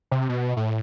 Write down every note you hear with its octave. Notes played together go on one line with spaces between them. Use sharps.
C3
B2
A2